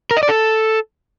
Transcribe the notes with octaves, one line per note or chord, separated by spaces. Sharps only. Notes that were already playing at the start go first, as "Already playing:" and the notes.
A#4
D#5
D5
A4